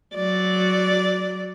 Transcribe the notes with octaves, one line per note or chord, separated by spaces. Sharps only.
F#3 D5